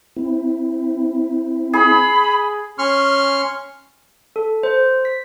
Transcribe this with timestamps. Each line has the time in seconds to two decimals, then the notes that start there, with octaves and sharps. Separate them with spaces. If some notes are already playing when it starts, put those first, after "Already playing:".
0.16 C4 E4
1.73 G#4 B5
2.78 C#4 C6 C#6 F6
4.36 A4
4.63 C5
5.05 B6